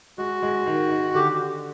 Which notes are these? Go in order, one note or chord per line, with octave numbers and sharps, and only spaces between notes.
G#3 F#4
G#3
D#3
D#3
D3 G4